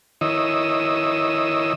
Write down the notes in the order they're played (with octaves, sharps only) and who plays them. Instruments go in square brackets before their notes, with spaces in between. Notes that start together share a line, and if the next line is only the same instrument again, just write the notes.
[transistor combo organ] D#3 E4 C#5 D#5 D#6 E6